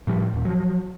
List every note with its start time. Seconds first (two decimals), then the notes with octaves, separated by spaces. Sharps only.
0.07 A2 F3 G3
0.34 D#2 A#2
0.45 F3 F#3